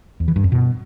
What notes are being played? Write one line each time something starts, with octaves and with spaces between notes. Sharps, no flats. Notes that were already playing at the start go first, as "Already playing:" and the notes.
E2
E3
G2
F2
B2